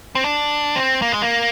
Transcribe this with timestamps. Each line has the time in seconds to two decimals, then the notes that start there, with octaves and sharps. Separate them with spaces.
0.15 C4
0.24 D4
0.75 C4
1.02 A#3
1.12 G#3
1.22 A#3